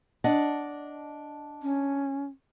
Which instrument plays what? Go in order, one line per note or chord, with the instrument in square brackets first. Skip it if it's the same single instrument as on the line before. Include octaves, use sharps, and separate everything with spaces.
[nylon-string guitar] D4 D#5 F#5
[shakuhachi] C#4